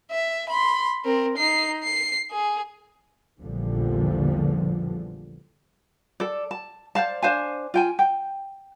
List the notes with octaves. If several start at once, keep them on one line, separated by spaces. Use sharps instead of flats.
E5
B5 C6
C4 A#4
D#4 C7
C7
G#4
A#1 E2 D3 F3 G3
A4 D5
A5
C5 D5 F5 A5
D4 C5 F5 G#5
F4 G5 G#5
G5